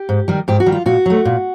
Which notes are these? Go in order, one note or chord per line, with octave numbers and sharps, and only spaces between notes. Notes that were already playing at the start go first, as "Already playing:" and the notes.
Already playing: G4
G#2
D#3 G3
G#2 G4
F#4
D#3 G3
F4
A#2 F#4
F#3 A3
A#2